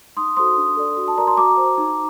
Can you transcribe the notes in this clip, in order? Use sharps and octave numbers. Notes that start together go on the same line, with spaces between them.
D#4 C6 D#6
F#4 A4 C5 C6 D#6
D4
A4 D5
F#4
A5
A#4 D5 A#5
C6
F#4 A#5 D6
C5
D#4